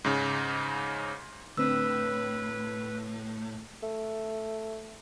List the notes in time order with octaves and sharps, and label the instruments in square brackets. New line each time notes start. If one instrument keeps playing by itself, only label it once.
[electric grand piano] G#2 C#3
[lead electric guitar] A2 [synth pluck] D3 C4 D4 [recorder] B4 [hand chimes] E6
[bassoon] A3